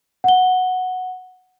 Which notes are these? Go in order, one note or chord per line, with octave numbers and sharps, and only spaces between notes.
F#5 G7